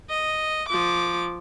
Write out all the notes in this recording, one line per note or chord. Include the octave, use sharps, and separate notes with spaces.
D#5
F3 D6